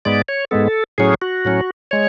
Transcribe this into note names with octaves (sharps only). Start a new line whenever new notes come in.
G#2 G#3 B3 D5
C#5
G#2 G#3 B3 A4
A2 F#3 C#4 G#4
F#4
A2 F#3 C#4
G#3 C#5